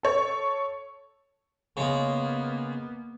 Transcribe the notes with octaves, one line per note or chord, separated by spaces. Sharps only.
A4 C#5
C#3 G#3 A#3 B3